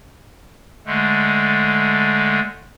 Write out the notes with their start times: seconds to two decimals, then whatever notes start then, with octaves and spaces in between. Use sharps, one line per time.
0.86 D3 G#3 A3